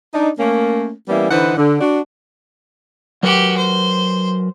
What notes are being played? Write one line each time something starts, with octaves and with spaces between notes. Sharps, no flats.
D4 D#4
A3 A#3 C#4
E3 G3 A#3 B3 C#4 E4
D3 E3 D#4 B4 C5 F#5
D3
D4 F#4
F#3 F#4 G4 A#4 B4
C5